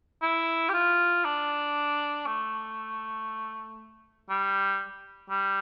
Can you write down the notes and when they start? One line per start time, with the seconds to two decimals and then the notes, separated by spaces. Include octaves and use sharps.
0.22 E4
0.69 G4
0.74 F4
1.25 D4
2.26 A3
4.29 G3
5.30 G3